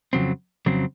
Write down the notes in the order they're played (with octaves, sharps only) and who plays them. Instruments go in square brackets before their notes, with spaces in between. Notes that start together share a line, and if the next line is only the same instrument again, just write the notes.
[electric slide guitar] F2 C#3 F#3 C4
F2 C#3 F#3 C4